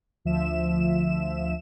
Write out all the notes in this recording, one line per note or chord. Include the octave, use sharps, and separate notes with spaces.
D2 F3 E5 E7